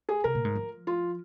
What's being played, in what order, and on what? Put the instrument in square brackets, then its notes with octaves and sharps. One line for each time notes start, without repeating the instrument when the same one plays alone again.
[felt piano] G#4
[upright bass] C3 [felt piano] A#4
[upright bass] A#2
G#2
F3
[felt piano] F4